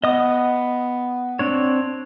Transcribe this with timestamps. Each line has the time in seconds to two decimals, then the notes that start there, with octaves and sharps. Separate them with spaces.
0.04 B3 D#5 D#6
1.39 C4 D4 C#5